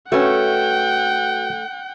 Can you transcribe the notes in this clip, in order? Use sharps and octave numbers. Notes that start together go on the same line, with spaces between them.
A3 C#4 F#4 B4 C#5 F#5 G5